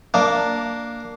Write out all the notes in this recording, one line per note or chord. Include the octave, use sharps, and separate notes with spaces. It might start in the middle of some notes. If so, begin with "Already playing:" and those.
A#3 D4